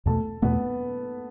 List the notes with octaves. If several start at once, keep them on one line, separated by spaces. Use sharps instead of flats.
E2 B2 A3 A4 A5
E2 B2 A3 B3 B4